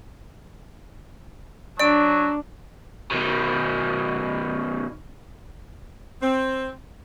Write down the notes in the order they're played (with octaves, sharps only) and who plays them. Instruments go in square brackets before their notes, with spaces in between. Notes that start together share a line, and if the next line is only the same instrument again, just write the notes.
[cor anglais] F#3 [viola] D4 [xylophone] D5 D7
[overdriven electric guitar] B2 D#3
[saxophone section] C4